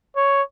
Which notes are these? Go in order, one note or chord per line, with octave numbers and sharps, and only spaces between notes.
C#5